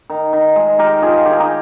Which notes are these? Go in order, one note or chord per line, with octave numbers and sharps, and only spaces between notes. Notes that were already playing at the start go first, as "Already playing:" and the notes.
D#3
D#3
G#3
D#3 G4 A#4
D#3 F4 G#4
D#3 G4
G#4
D#4 G4